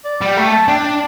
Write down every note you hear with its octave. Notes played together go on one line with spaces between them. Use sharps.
D5
G3 G5
A3
A5
D4 G5